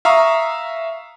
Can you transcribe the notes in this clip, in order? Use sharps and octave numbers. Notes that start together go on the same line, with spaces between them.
E5 F5 A#5 C#6 D#6